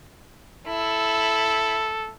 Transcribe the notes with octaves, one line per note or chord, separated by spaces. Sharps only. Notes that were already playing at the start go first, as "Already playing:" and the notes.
E4 A4